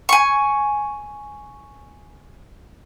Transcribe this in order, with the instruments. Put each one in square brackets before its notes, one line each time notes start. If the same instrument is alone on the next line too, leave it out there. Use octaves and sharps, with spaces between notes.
[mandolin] G#5 C#6